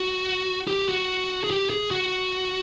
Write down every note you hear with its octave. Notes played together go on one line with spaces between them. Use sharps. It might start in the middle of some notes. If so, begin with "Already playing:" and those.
Already playing: F#4
G4
F#4
G#4
G4
G#4
F#4